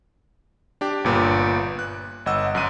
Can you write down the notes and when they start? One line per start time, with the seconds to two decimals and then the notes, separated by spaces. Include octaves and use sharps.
0.81 D4 G4
1.04 G1 A#2 B4
1.79 F#6
2.26 G1 D#5 F#5 E6
2.55 F#2 F#6 D#7